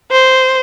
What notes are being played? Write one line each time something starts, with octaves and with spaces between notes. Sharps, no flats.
C5